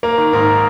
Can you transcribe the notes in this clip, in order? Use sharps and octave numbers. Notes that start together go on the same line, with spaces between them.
A#3 A#4
D#3
G#2 A#4